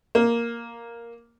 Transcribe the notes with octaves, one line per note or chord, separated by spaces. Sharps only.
A#3